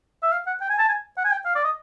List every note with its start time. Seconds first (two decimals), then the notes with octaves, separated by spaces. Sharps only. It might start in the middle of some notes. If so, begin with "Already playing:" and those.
0.23 E5
0.32 F5
0.47 F#5
0.61 G5
0.70 G#5
0.79 A5
0.88 G#5
1.17 F#5
1.25 G#5
1.31 G5
1.45 F5
1.55 D5
1.65 D#5